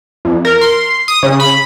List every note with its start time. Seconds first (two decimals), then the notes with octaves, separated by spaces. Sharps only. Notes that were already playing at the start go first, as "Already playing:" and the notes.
0.25 F2
0.45 A#4
0.61 C6
1.08 D#6
1.23 C#3
1.40 B5